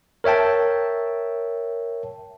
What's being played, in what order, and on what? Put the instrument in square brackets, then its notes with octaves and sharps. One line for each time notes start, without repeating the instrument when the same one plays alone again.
[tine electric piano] A#4 C#5 E5 G5 A5